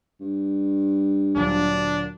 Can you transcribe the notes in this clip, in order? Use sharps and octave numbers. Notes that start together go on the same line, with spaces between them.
G2
D2 A#2 F#3 D4